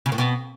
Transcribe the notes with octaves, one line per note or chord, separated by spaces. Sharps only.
C#3
A2
B2